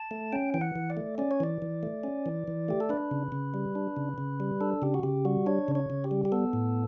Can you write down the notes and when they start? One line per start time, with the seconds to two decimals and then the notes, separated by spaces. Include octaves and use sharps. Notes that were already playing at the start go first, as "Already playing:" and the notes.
Already playing: A5
0.11 A3
0.32 C#4 G5
0.54 E3 G5
0.61 F#5
0.76 E3
0.90 D5
0.97 A3
1.18 C#4 D5
1.31 C#5
1.40 E3 D5
1.62 E3
1.83 A3
2.04 C#4
2.26 E3
2.48 E3
2.68 A3 G4
2.80 A4
2.89 D4 B4
3.11 C#3
3.32 C#3
3.54 G3
3.75 D4
3.97 C#3
4.18 C#3
4.40 G3
4.61 D4 A4
4.82 C#3 G4
4.94 F#4
5.03 C#3 G4
5.25 G3 F#4
5.46 D4 C#5
5.68 C#3
5.75 C#5
5.90 C#3
6.04 G4
6.11 G3
6.25 G4
6.32 B3 A4
6.53 A2